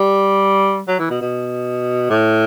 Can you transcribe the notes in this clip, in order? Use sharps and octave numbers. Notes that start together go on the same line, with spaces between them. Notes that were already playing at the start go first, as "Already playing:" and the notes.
Already playing: G3
F#3
E3
B2
B2
A2